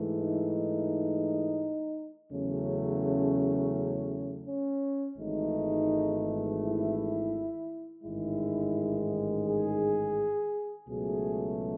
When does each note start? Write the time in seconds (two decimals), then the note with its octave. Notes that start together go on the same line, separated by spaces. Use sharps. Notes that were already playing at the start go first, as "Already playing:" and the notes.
Already playing: G#2 E3 A3
0.18 D#4
2.32 E2 C#3 F#3 A3 C#4
3.03 C#4
4.45 C#4
5.17 G#1 G#2 E3 A3 D#4
6.60 E4
8.03 A1 G#2 D#3 G#3 E4
9.45 G#4
10.88 C#2 B2 F#3 A3 G#4